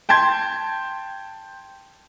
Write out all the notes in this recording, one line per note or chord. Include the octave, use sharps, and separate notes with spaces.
G5 A5 C6 G#6